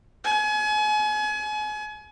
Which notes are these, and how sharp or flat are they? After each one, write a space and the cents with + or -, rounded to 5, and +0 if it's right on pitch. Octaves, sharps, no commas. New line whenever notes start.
G#5 +35